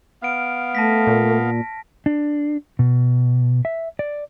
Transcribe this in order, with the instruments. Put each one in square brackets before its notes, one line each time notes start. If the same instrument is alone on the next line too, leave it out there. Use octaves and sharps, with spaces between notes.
[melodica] B3 F5 [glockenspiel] F6 D7
[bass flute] A3 [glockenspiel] A5 A#6 B6
[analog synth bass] A#2
[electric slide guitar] D4
B2
E5
D5